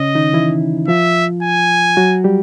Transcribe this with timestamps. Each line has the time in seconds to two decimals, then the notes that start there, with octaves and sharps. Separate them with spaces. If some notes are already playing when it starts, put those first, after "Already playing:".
Already playing: C#3 C#4 D#5
0.15 D#3 D#4
0.33 E3 E4
0.88 F3 F4 E5
1.43 G#5
1.97 F#3 F#4
2.24 G3 G4